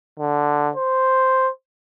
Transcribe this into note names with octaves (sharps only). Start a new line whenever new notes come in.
D3
C5